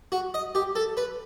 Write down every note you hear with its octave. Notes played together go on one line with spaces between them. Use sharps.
F#4
D#5
G4
A4
B4